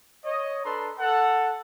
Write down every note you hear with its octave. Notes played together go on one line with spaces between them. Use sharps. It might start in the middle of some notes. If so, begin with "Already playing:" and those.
C#5 D#5
D4 A4 B4 A#5 C6
A4 F#5